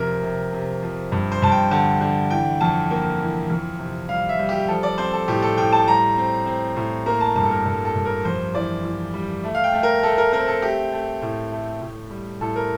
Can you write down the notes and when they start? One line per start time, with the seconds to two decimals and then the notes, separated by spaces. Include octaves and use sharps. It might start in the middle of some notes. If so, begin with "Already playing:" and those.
Already playing: F2 C3 A#4
0.23 C3
0.53 C3
0.82 F3
1.12 G2
1.32 C5
1.42 G2 A5
1.52 G5
1.71 D3 A5
2.01 D3
2.30 E3 G5
2.61 F2 A5
2.90 A#3 G5
3.20 E3
3.50 F2
3.79 C3
4.09 G3 F5
4.29 E5
4.39 G3
4.49 G4
4.69 F3 A4
4.83 D5
4.98 C4 C5
5.13 A4
5.28 A2 G4
5.42 A4
5.57 A2 G5
5.72 A5
5.87 G3 A#5
6.18 C4
6.46 C4
6.76 A2
7.06 A#3 A#5
7.21 A5
7.36 G2 A5
7.43 A4
7.51 A#4
7.66 G2 A4
7.85 A4
7.95 G2
8.05 A#4
8.25 F2 C5
8.55 E3 D5
8.84 E3
9.14 G3
9.44 A3
9.55 F5
9.64 G5
9.73 A3
9.83 A#4
10.03 A3 A4
10.18 A#4
10.33 C4 A#4
10.48 A4
10.62 A3 G4
10.92 A3
11.22 A2
11.52 A3
11.82 A2
12.11 G3
12.41 A2 A4
12.56 A#4